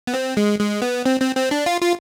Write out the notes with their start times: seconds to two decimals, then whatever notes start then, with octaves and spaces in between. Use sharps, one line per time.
0.07 B3
0.14 C4
0.37 G#3
0.60 G#3
0.82 B3
1.06 C4
1.21 C4
1.35 C4
1.51 D4
1.66 F4
1.81 F4